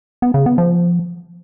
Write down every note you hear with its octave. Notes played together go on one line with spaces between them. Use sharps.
B3
C#3
B3
F3